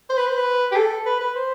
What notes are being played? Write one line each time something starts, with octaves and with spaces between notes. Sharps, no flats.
C5
B4
C5
B4
G4
A4
B4
B4
C5